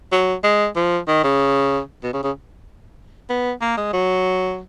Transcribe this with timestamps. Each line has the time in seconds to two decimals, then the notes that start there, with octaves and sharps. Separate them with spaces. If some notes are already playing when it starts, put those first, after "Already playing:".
0.12 F#3
0.44 G#3
0.76 F3
1.08 D#3
1.24 C#3
2.03 B2
2.13 C#3
2.24 C#3
3.29 B3
3.62 A#3
3.77 G#3
3.93 F#3